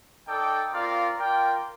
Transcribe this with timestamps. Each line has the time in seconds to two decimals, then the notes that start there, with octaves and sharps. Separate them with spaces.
0.26 D#4 A4 D5 G5
0.71 C4 F4 A#4 D5 F5
1.18 F4 A#4 D5 G5